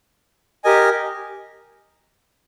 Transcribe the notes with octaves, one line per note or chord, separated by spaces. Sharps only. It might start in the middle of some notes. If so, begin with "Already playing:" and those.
G4 A#4 D#5 G#5